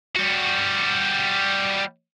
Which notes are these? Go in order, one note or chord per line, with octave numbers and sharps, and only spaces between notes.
G3 F#4